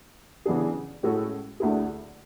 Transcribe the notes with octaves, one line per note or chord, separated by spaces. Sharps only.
C#3 E3 B3 D4 G#4
A2 G#3 C#4 F#4 A4
D2 D3 A3 E4 G#4